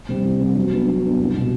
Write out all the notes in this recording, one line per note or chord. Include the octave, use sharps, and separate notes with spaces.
C3 G3 C4 G4
C2
C3 G3 C4 G4
F#3
B3 D4
F#3
B3 D4
C2
B2 F#3